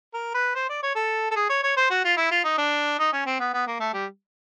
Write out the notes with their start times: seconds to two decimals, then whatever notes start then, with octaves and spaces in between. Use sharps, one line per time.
0.14 A#4
0.34 B4
0.55 C5
0.69 D5
0.83 C#5
0.95 A4
1.31 A4
1.36 G#4
1.50 C#5
1.63 C#5
1.77 C5
1.91 F#4
2.05 F4
2.17 E4
2.31 F4
2.44 D#4
2.58 D4
2.99 D#4
3.13 C#4
3.26 C4
3.40 B3
3.54 B3
3.67 A#3
3.80 A3
3.93 G3